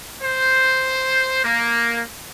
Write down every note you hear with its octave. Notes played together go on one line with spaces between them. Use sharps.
C5
A#3